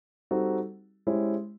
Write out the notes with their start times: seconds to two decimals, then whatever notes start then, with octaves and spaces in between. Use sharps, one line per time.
0.31 G3 C4 D#4 F#4 A4
1.07 G#3 C#4 E4 G4 C5